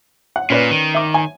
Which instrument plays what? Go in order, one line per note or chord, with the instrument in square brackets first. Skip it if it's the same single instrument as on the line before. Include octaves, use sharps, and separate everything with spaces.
[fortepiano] F#5
[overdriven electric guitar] A#2 [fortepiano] C#4 B4 D5
[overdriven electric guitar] D#3
[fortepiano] E5 D6
G#5